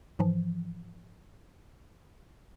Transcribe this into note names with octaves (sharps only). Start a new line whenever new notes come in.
G#2 E3 F3